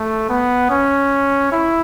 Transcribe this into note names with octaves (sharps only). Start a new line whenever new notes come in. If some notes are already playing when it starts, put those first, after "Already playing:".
Already playing: A3
B3
C#4
E4